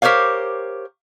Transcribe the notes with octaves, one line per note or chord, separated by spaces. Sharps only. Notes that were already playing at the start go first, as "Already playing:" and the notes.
G4 A#4 C5 C#5 F5